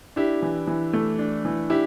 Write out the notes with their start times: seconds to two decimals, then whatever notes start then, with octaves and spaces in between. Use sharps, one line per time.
0.16 D4 E4 G4
0.42 E3
0.67 E3
0.93 A3
1.19 D4
1.45 E3
1.70 D4 E4 G4